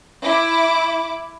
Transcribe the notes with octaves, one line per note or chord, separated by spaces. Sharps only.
E4 D6